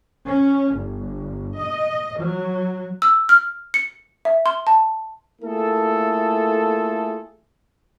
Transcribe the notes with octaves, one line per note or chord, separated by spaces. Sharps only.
C#4
G1
D#5
F#3
E6
F6
C#7
E5
C6
A5
A3 A#3 E4 F4 G#4 A4